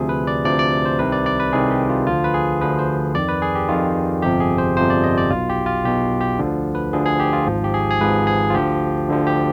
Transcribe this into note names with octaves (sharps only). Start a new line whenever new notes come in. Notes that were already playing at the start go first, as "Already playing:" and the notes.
Already playing: D2 C3 F3 G#4
B4
D5
D2 C3 F3 D5
D5
C5
C2 C3 D#3 B4
D5
D5
B4
C2 C3 D#3 G#4
G4
F4
D2 D3 F3 F4
B4
G#4
D2 D3 F3 B4
C5
F2 D#3 D5
B4
G#4
G4
F2 D#3 F4
G1 F2 C3 F3 G4
G#4
C5
G1 F2 C3 F3 C5
D5
D#5
D5
B1 B2 F4
G4
F4
B1 B2 G4
G4
D2 D3 F3
B4
D2 D3 F3 G#4
G#4
G4
F4
G#1 G#2 F3
G4
G#4
G#4
G#1 G#2 F3 B4
G#4
F4
D2 D3 F3 G4
D2 D3 F3
G4